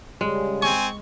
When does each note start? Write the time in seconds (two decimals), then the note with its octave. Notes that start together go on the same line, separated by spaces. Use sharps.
0.21 C#3 G3 G#3 C#4
0.62 C4 G#5 C#6